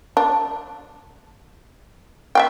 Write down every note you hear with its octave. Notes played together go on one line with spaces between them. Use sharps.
D4
E5 F5 G5